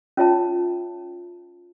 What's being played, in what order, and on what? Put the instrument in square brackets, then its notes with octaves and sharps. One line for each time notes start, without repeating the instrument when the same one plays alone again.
[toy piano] C#4 F4 C#5 E5 A5